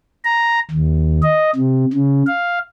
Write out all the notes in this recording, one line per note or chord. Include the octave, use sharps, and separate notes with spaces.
A#5
D#2
D#5
C3
C#3
F5